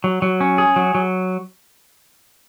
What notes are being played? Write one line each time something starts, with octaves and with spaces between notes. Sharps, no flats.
F#3
F#3
C#4
G#4
F#3
F#3